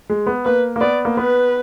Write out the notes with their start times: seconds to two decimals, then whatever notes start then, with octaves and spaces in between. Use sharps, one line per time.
0.09 G#3
0.26 B3
0.45 A#3 B4
0.76 A#3
0.81 B3 D5
1.05 A#3
1.17 B3 B4